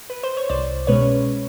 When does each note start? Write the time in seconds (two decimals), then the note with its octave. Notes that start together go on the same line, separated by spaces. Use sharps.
0.10 B4
0.23 C5
0.37 C#5
0.49 C2 C5 D5
0.87 B2 G#3 C#4 B4 C#5